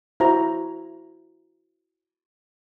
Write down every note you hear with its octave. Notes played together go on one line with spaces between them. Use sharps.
E4 F#4 C5 A#5